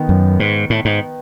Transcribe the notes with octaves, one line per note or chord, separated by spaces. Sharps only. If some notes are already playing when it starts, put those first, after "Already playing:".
Already playing: D#3 B3
F#2
G#2
A2
G#2